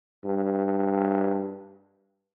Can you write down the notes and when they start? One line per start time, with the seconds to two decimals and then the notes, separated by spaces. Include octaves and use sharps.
0.24 G2